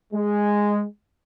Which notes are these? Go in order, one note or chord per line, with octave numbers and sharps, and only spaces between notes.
G#3